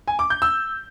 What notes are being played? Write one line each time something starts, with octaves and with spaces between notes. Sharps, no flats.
G#5
D6
G6
E6